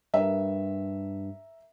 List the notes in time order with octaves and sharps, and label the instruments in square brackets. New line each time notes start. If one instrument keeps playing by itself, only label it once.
[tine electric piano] G2 [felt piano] A#4 E5